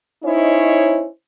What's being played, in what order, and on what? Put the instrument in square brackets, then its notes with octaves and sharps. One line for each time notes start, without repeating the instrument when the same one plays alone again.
[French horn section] C#4 D#4 E4 C5 C#5 D#5